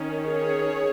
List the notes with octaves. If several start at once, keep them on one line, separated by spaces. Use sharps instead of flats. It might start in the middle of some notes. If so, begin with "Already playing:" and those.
Already playing: D#3 C#4
G#4 C#5